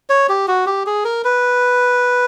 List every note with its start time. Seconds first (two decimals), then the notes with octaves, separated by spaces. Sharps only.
0.10 C#5
0.29 G4
0.48 F#4
0.66 G4
0.86 G#4
1.05 A#4
1.24 B4